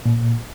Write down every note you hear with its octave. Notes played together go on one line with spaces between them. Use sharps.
A#2